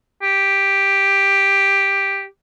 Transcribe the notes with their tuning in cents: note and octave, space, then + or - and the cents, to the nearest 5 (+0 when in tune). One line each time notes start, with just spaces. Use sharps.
G4 +5